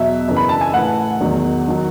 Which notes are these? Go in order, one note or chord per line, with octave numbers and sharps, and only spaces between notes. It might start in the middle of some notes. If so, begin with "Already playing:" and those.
Already playing: E2 B2 F#3 E5
F#2 C#3 E3
B5
A5
G#5
A2 E3 F#5
E2 D#3 F#3
D#3 F#3